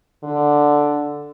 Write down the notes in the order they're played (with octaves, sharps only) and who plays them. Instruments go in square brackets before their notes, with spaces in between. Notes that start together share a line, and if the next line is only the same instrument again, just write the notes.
[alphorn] D3